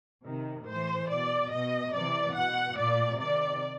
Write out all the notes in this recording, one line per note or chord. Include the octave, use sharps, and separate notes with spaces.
C3 D#3
A2 E3 C5
B2 D5
B2 D#5
C3 E3 D5
B2 F#5
A#2 D5
C3 D#3 D5